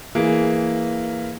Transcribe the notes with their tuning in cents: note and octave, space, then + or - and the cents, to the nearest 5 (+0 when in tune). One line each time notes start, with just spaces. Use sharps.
E3 +0 A#3 -10 G#4 +0